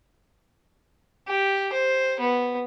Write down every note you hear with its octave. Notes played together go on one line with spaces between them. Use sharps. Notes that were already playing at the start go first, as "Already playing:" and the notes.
G4
C5
B3